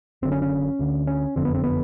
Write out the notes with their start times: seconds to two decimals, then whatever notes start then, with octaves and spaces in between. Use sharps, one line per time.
0.22 F#1 F#2 D3 C4
0.32 C#4
0.42 C#4
0.79 D2 D3
1.07 C#4
1.36 F#1 F2 D3 C4
1.45 B3
1.55 C4
1.64 B3